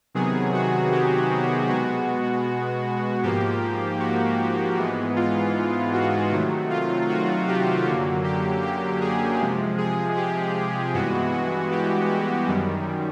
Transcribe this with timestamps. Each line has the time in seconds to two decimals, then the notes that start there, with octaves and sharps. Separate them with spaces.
0.14 C3 D#3 F#3 B3 G#4
0.54 F#4
0.91 G4
1.69 B2 G#3 B3 F#4
3.23 G#2 F3 A#3 G4
4.00 F#4
4.77 G#2 E3 G#3 B3
5.16 F4
5.93 F#4
6.32 C3 D#3 F#3 A3
6.70 F4
7.08 F#4
7.47 G4
7.86 F#2 D3 F#3 A#3
8.24 G4
8.62 G4
9.01 G#4
9.40 C3 F3 G#3
9.78 G#4
10.16 G4
10.94 G2 E3 G#3 B3 F#4
11.33 F#4
11.71 G4
12.09 F#4
12.48 F#2 D#3 G3